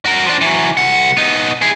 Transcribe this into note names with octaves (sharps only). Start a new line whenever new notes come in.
F#4 A#4
F3 D4
E3 F#3
C2 F#5
B3 D#4
E4 G#4